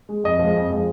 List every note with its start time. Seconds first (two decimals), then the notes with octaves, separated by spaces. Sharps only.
0.09 G#3
0.24 F2 D#5
0.39 F3 G#3
0.55 F2
0.70 F3 G#3